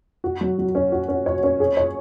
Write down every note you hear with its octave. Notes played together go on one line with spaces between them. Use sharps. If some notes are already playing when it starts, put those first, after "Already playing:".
F#4
F#3
F#3
C#4
F#4
C#4
C#5
C#4
G#4
C#5